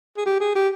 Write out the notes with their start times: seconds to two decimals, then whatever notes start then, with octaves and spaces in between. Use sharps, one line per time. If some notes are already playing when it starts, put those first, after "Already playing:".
0.17 G#4
0.25 G4
0.40 G#4
0.55 G4